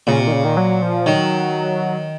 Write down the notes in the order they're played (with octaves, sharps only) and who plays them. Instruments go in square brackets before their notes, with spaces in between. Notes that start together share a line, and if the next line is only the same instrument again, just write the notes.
[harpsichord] A#2 [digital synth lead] C#3
[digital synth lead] C3
D#3
C#3
D#3
F#3
F3
[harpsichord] D#3 [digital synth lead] F#3